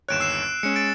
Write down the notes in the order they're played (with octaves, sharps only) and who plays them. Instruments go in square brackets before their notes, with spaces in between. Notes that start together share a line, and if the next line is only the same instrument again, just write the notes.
[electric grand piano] G1 D#2 C#5 [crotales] F#6 D7 E7
[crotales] E6 C7 E7
[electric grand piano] G#3 C#4 [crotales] C#7
[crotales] A6 D7